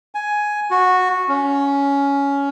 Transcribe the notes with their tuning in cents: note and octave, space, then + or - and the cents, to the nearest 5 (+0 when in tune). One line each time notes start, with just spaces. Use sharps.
G#5 +10
F#4 -10
C#4 +15